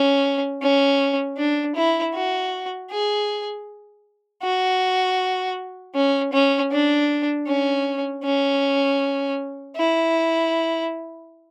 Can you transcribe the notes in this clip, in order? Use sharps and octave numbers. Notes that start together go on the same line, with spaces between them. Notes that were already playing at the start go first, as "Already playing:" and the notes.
Already playing: C#4
C#4
D4
E4
F#4
G#4
F#4
C#4
C#4
D4
C#4
C#4
E4